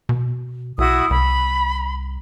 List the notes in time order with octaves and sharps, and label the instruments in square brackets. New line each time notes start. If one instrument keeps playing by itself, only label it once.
[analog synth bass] B2
[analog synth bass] B1 [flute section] E4 F#4 D#6
[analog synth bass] C2 [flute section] B5